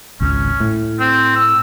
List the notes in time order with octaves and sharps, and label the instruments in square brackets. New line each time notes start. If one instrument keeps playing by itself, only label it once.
[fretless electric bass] G#1 C#2 [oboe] C#4
[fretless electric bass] A2
[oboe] C4
E6